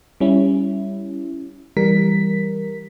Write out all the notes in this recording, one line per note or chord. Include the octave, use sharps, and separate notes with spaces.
G3 C#4 E4
E3 G3 A#4 B6